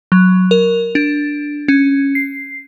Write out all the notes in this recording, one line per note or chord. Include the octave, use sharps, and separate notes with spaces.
F#3
A#4
D4
C#4
C7